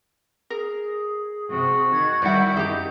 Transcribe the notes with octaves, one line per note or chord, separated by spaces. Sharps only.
G#4 A#4
C3 F#4
D#3 G#6
D#3 G3 E4 D5 F#5 G6
F#2 D#3 G4 G#4